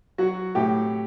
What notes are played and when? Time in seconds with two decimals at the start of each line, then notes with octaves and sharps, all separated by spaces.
0.18 F#3 F#4
0.55 A2 G4